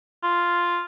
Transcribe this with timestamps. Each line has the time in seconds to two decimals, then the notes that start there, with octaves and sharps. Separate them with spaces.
0.23 F4